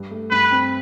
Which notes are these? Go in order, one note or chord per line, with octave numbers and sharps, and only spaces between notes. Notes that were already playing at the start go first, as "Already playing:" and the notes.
Already playing: G2 G3
A3
G2 B4
C4